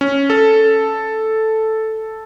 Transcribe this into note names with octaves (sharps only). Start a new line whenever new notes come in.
C#4
A4